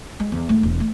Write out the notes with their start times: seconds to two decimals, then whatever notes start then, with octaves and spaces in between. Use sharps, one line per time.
0.20 G#3
0.32 E2 D#3
0.49 G#2 A3
0.63 E1
0.80 A3